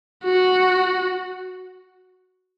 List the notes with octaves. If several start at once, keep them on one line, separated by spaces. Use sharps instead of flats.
F#4